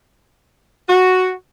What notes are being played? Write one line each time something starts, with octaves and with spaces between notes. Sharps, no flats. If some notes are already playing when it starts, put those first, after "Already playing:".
F#4